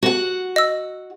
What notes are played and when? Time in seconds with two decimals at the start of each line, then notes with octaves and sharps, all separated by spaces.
0.03 F#4 F#5
0.56 D#5 E6